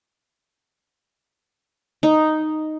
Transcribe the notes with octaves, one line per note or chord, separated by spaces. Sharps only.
D#4